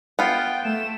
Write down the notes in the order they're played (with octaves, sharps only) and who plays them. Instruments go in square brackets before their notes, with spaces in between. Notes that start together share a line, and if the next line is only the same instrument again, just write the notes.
[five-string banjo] B3 F4 [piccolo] G5
[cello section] A3 [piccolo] E7